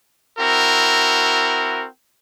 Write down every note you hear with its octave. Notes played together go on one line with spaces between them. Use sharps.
C4 E4 F#4 A#4